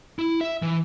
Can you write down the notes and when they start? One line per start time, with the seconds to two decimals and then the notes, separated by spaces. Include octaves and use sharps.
0.19 E4
0.41 E5
0.62 E3